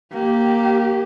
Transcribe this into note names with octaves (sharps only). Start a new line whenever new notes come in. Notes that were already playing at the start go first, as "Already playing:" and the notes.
A#3 G4